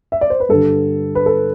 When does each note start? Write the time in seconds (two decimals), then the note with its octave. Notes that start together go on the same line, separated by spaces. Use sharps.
0.12 E5
0.21 D5
0.30 C5
0.40 B4
0.49 G2 D3 A4
1.15 B4
1.26 A4